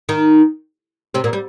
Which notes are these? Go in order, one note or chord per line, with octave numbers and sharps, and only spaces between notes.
D#3 D#4
C3 C4
A#2 A#3
G3